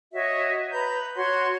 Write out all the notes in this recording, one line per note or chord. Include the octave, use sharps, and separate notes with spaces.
F#4 C#5 D#5 E5
B4 A#5 G6
F#4 C#5 F#5 C6